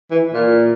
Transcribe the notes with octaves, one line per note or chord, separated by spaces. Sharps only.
E3
A#2